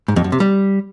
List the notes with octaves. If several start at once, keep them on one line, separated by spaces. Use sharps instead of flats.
G#2
F2
F#2
C3
G3